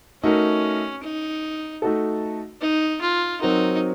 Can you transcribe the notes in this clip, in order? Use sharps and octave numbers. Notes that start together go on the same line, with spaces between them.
A3 C#4 D#4 F#4 A#4
D#4
A3 D#4 F#4 A4
D#4
F4
F#3 C4 D#4 F#4 A#4